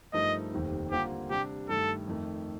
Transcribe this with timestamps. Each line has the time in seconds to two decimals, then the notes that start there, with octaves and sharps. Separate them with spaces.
0.13 G2 F3 A3 D#4 A#4 D#5
0.52 F1 D#2 D#3 G3 C4
0.91 D3 G3 A#3 F4 G4 C5
1.30 C3 G3 D4 G4
1.69 G2 D#3 A3 A4
2.08 F2 D#3 A3 D#4 A#4